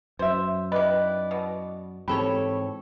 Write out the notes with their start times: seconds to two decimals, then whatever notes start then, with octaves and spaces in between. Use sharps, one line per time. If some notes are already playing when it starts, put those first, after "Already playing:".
0.19 F#2 C5 E5
0.72 D#3 E4 B4 D5 D#5
1.31 B2
2.08 G#2 E3 C4 G4 A4 C#5 B5